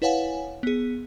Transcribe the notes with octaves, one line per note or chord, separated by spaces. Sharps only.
E4 B4 C#5 F5 F#5 G#5
B3 G#4